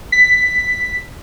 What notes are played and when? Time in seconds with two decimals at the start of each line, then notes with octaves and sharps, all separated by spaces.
0.12 B6